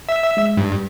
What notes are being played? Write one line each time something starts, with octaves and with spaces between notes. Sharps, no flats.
E5
G#3
G2 G3